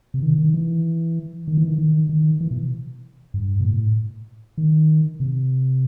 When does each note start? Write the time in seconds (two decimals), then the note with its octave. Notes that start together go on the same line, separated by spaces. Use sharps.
0.14 C3
0.22 D#3
0.38 D#3
0.54 E3
1.48 D#3
1.57 E3
1.66 D#3
1.78 D#3
2.09 D#3
2.41 E3
2.51 B2
3.34 G2
3.60 B2
3.65 A2
4.58 D#3
5.20 C3